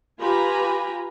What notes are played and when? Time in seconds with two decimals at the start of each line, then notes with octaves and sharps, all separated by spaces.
0.20 F4 G4 B4 G#5 A#5 B5